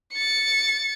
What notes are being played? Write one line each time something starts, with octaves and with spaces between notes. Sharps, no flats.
A6 C#7